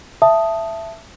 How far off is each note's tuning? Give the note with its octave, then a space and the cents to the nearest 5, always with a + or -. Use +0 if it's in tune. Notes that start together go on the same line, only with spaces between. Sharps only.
E5 +10 A5 +0 D#6 +0